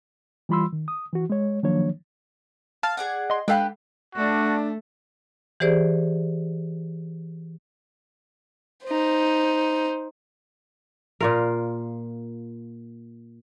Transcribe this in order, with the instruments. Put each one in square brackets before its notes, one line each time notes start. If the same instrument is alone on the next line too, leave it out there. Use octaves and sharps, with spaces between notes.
[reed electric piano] E3 G3 F4 B5 C6 E6
D#3
D#6
E3 F#4
G#3 C#5
D#3 F3 F#3 A#3 D4 C#5
[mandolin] F5 [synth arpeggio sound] A5 F6 A6
[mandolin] G#4 D5 F#5
[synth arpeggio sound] D#5 C6
[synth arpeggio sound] G#3 A4 F5 [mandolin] D4 G4 B4
[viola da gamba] A3 [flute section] D4 [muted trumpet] F#4
[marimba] E3 G4 G#4 C5 D5
[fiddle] D#4 C5
[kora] A#2 F4 A#4